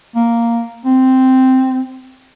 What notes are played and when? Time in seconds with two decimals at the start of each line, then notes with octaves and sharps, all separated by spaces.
0.15 A#3
0.85 C4